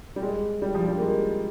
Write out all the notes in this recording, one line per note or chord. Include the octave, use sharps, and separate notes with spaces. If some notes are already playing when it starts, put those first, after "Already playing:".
G3
G#3
G3
F3
G3
A#3
G#3